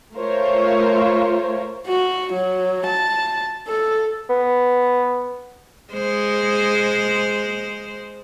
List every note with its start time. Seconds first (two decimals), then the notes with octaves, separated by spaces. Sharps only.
0.15 A3 F4 A#4 C5 C#5
1.87 F#4
2.33 F#3
2.86 A5
3.67 A4
4.30 B3
5.93 G#3 C5